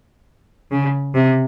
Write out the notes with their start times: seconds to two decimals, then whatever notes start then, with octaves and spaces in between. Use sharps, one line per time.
0.71 C#3
1.15 C3